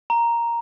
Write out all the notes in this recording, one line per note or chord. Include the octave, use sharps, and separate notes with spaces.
A#5